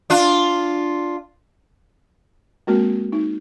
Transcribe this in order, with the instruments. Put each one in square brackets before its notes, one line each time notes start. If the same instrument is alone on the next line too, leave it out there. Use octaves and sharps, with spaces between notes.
[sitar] D4 F4
[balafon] G#3 A#3 C4 F#4 A#4
D#4